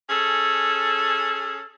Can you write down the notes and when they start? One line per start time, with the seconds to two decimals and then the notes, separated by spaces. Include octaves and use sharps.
0.10 C#4 G#4 A4